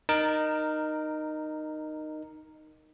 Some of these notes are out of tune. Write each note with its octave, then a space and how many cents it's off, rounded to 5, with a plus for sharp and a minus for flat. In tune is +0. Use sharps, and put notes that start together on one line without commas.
D#4 -15 A#4 +0